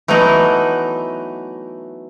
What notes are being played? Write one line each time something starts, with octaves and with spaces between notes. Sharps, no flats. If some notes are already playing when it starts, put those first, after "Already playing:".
E3 F#3 A3 B3 D#4 E4